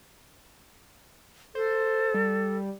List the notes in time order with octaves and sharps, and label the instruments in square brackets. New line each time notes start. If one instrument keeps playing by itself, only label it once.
[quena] A4 [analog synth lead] C5
[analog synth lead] G3